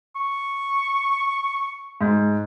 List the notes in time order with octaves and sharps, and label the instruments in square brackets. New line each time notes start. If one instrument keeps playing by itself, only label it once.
[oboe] C#6
[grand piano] G#2